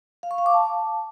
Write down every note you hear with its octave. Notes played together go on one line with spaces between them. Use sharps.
F5
C#6
F5
D6
A5